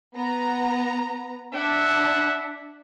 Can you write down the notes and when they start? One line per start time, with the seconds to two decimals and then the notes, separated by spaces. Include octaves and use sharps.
0.16 B3 A#5
1.54 D4 E4 E5 F#5